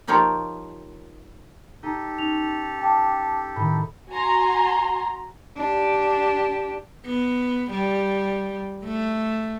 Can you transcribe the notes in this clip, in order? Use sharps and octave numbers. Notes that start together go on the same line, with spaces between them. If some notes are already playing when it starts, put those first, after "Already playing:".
F3 A#3 D#4 F4 G4 C#5
D#4 G4 A4
C#4 D#4 F7
G5 A5 D6
A2 D#3 B5
F#4 G#5 A#5 C6
D4 G4
B3
G3
A3